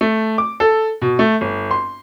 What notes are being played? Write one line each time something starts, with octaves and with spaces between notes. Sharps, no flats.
A3
D6
A4
B2
A3
G1
C6